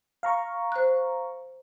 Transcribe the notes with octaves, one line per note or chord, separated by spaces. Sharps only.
F5 A#5 C#6
C5 F#6